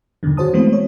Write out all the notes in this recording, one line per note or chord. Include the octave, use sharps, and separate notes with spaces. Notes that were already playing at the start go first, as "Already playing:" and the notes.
E2 G2 B2 D3 D#3
F#4 G#4 C5 C#5 A5 D#6
E3 G#3 A3 B3 C4 C5
C#5